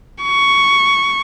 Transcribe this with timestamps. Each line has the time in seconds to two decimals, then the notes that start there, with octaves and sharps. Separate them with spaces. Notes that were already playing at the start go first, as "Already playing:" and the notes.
0.23 C#6